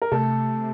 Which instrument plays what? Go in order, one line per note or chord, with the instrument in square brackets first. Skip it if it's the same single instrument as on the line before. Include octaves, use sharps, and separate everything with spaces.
[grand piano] A#4
[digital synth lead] C3 [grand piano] A3 A4